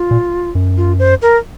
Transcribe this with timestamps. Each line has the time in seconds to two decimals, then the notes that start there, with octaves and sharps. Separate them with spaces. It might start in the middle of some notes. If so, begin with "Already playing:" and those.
Already playing: F4
0.11 A#2
0.55 F#2
0.77 F4
0.99 C5
1.22 A#4